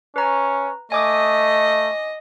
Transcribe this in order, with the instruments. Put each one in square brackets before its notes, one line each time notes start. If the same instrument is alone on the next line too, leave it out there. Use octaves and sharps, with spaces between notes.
[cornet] C#4 [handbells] B4 A#5
[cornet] A3 [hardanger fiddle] D#5 [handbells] G#5 D6 D#6